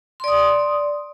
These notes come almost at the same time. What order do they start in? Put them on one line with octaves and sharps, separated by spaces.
C6 D5 D#6